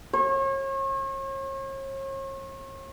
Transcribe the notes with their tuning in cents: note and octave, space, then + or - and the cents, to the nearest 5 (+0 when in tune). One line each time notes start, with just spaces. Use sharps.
C#5 -40